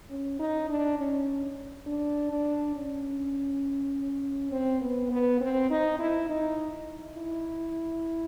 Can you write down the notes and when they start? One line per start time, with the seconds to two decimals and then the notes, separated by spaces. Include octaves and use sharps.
0.10 C#4
0.39 D#4
0.69 D4
0.99 C#4
1.87 D4
2.31 D4
2.76 C#4
4.52 C4
4.81 B3
5.11 B3
5.41 C4
5.70 D#4
5.99 E4
6.30 D#4
7.18 E4